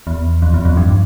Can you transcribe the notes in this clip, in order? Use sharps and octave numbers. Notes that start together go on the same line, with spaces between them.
E2
F2
E2
F2
G2